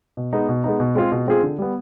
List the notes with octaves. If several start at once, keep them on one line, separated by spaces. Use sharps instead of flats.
B2
G#3 B3 D#4
B2
G#3 B3 D#4
B2
G#3 C4 F4 G#4
B2
G#3 C4 F4 G#4
D3
G3 B3